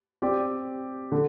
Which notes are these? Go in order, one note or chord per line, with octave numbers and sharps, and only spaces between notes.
C4 G4 D5
D3